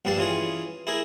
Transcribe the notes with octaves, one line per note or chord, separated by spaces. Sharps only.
A#1 G2 G3 D4 F5 A5
E3 C#4 F4 G#4
E4 G#4 A#4